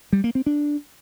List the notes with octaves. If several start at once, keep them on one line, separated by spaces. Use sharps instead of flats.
G3
A#3
C4
D4